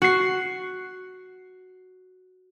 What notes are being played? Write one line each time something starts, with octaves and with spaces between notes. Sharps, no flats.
F#4 C7